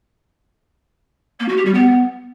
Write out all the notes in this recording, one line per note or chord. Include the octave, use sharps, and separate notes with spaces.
A#3
F#4
G4
G3
B3